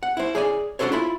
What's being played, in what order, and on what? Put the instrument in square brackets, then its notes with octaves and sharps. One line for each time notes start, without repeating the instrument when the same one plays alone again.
[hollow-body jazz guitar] F#5
E4 C5
G#4 C#5 D5 G#5
C#4 D4 F#4 A4 C5 C#5
E4 F4 B5